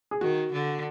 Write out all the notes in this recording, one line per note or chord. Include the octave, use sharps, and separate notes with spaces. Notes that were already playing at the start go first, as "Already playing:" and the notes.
G#4
D#3 F#4
D3